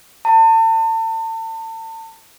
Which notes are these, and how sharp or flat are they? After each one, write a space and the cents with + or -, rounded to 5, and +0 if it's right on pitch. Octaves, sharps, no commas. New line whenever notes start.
A5 +35